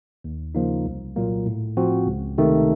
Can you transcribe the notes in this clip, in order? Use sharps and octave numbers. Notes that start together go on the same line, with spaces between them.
D#2
C#3 F3 A#3 D#4
C2
A#2 F#3 A#3
A2
F3 C4 F#4
C#2
C3 D#3 A3 D#4